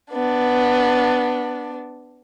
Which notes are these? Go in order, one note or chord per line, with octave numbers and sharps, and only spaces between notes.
B3 D4